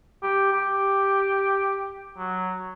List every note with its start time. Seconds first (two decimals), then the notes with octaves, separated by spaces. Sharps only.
0.23 G4
0.53 G4
2.18 F#3